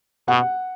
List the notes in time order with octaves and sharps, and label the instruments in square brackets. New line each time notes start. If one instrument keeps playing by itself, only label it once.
[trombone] B2 [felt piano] F#5